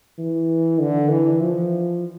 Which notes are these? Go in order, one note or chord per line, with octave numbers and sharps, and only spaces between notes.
E3
D3
E3
F3